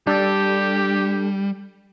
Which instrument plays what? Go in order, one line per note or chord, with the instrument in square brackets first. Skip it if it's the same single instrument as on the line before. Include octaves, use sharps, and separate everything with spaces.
[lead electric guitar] G3 [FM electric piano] D4 A4 D5 [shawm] G4